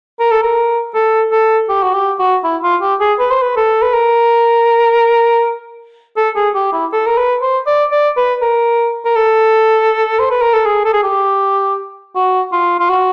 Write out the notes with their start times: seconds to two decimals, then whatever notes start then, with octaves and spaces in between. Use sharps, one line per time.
0.20 A#4
0.31 A4
0.43 A#4
0.95 A4
1.31 A4
1.69 G4
1.83 F#4
1.94 G4
2.19 F#4
2.44 E4
2.63 F4
2.82 G4
3.00 G#4
3.19 B4
3.31 C5
3.42 B4
3.57 A4
3.82 B4
3.94 A#4
6.17 A4
6.36 G#4
6.55 G4
6.73 E4
6.93 A4
7.06 A#4
7.17 B4
7.42 C5
7.67 D5
7.91 D5
8.17 B4
8.42 A#4
9.05 A#4
9.16 A4
10.19 C5
10.30 B4
10.41 A#4
10.53 A4
10.65 G#4
10.85 A4
10.93 G#4
11.03 G4
12.15 F#4
12.52 F4
12.79 F4
12.89 F#4